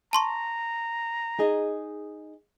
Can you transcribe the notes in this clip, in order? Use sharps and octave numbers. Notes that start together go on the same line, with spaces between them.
A5 A#5 C6 C#6
D#4 G#4 D#5